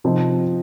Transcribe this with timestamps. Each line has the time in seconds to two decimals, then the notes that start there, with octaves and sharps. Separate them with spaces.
0.04 C3 F3 C4 D#4